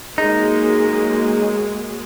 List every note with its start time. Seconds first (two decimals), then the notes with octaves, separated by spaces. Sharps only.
0.18 F#3 G#3 A#3 D#4 G#4